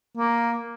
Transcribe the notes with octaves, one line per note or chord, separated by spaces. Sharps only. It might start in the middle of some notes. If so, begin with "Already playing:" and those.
A#3